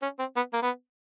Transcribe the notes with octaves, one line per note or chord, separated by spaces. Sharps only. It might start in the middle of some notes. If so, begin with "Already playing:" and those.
C#4
C4
B3
A#3
B3